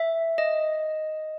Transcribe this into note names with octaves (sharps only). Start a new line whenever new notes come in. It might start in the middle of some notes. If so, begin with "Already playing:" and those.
Already playing: E5
D#5